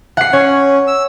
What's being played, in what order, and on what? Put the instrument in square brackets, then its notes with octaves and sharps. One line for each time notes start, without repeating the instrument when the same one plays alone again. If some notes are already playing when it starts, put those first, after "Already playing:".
[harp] F#5 C7
[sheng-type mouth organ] C#4 [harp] C#5
[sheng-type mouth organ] E6